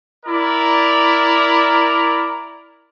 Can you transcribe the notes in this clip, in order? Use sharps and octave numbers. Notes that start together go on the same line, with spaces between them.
E4 A#4 D5 A#5